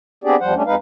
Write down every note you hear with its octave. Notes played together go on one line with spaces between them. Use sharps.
B3 C4 D4 G4 G#4 D5
E2 F3 G3 C5 F#5
G3 A3 C#4 D4
F2 G#3 D#4 B4 F5